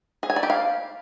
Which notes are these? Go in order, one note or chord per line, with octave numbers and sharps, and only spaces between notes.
G#4
G#5
D5
G4
F5